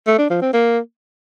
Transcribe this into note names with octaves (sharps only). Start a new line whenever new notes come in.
A3
D4
F3
C4
A#3